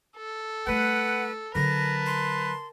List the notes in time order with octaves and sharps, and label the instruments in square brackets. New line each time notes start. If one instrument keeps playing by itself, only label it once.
[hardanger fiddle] A4
[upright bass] G3 A3 [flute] B4 [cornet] F#5
[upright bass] D3 F#3 [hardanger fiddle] A#4 A5 [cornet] B4 [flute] A#6
[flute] C6